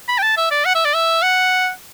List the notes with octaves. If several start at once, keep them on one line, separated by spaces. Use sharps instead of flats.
B5
G5
A5
E5
D5
F#5
E5
D5
E5
F#5